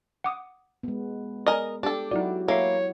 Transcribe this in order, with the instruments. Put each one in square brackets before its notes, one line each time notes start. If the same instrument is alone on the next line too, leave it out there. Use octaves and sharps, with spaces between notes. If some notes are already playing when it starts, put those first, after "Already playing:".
[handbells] F#5 D6 D#6
[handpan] G#3 B3
[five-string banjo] A#4 D#5 [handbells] D5 G#5
[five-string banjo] D4 A4 [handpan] G4
[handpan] F#3 E4 F#4 [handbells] D#4 D5
[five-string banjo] A#3 [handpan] E4 [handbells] A4 E5 C7 [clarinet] C#5